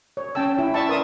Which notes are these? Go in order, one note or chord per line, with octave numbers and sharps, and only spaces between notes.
C#5
C#4 G5 A5 E6
E4
D5 E5 A5 C#6
A#4 B4 A5 C6 D#6